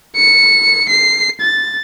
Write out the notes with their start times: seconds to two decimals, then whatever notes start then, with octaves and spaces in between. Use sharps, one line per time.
0.16 C#7
0.89 C7
1.41 A6